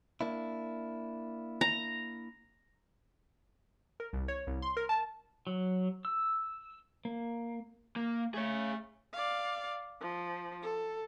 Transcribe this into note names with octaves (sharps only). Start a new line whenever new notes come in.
A#3 D4 E4
A#5
A#4
C2
C#5
C2
C6
A#4
A5
F#3
E6
A#3
A#3
A3 G#4 C#5
D5 F5
F3
A4